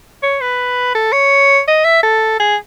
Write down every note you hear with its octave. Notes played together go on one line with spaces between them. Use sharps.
C#5
B4
A4
C#5
D#5
E5
A4
G#4